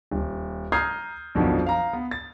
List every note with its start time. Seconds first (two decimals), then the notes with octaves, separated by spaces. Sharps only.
0.11 D#1
0.72 A#5 D#6 F6 G6 G#6 C7
1.35 A#1 F2 B2 D#3 F3 F#3
1.66 F5 A#5
1.93 B3
2.11 A6